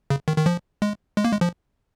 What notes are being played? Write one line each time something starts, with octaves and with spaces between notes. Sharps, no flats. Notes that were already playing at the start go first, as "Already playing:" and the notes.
C#3
D#3
D#3
F3
G#3
G#3
A#3
G#3
F3